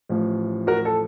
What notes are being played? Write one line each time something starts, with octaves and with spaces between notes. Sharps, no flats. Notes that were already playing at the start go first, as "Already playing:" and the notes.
A1 A2 F3
F#4 A#4
A4